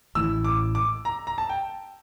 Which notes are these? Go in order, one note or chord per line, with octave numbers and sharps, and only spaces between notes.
A1 A2 E3 E6
D6
D6
A#5
A#5
A5
G5